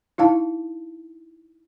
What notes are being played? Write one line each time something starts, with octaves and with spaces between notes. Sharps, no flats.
D#4 E4 F5 A5